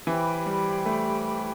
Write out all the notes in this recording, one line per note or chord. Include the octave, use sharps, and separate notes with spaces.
E3 G4 C5 G5 B5
G3
A3